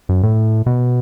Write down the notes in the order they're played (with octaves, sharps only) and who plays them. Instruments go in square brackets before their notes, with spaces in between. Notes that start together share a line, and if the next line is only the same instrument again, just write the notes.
[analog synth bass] F#2
A2
B2